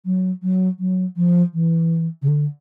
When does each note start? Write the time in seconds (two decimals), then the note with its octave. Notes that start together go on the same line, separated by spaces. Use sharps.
0.05 F#3
0.43 F#3
0.79 F#3
1.16 F3
1.54 E3
2.22 C#3
2.28 D3